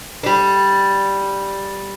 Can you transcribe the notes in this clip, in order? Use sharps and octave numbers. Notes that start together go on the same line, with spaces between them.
G3 D4